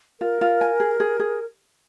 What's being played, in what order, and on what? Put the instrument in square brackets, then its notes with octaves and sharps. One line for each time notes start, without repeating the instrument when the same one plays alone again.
[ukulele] F4 [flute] A#4
[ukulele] F4
G#5
G#4
G#4
G#4